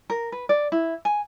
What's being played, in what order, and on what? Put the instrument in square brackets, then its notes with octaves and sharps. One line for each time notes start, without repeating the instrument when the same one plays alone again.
[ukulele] A#4
B4
D5
E4
G#5